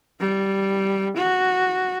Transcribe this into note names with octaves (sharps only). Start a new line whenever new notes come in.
G3
F#4